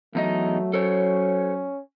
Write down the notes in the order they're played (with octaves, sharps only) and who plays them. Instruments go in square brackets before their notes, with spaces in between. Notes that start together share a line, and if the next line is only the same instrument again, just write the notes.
[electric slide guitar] E2 D#4 D#5 [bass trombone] F#3 [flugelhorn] A3
[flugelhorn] C#4 [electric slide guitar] A4 C5 C#5